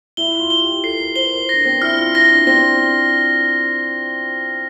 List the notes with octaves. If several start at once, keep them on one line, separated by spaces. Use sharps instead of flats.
E4 G7
F4
G7
G4
A4 C7
A#4
C5 G7
A#4
D4 A#6
C4
E4 F6
F4
E4 A#6
D4
C4 A#6